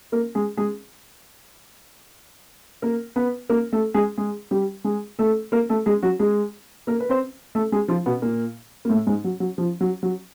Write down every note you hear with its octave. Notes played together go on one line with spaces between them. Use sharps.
A#3 A#4
G#3 G#4
G#3 G#4
A#3 A#4
B3 B4
A#3 A#4
A3 A4
G#3 G#4
G#3 G#4
G3 G4
G#3 G#4
A3 A4
A#3 A#4
A3 A4
G#3 G#4
F#3 F#4
G#3 G#4
A#3 A#4
B4
C4 C5
A3 A4
G#3 G#4
F3 F4
B2 B3
A#2 A#3
A#3
A2 A3
G#2 G#3
F#3
F#3
F3
F#3
F#3